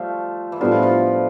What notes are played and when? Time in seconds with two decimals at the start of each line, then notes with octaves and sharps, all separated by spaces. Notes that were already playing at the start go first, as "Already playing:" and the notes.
Already playing: F3 G3 A3
0.52 E3
0.60 A2 F3 G3 B3 D4 F4
0.71 F3
0.83 F3